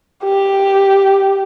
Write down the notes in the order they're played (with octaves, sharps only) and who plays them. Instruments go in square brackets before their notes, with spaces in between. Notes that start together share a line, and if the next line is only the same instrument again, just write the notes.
[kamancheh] G4